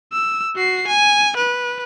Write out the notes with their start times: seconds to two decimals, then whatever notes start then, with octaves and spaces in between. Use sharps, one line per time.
0.12 E6
0.55 F#4 C7
0.87 G#5
1.37 B4